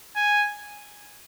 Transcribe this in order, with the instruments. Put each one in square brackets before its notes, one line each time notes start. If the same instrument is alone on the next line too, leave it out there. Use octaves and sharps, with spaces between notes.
[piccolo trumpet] G#5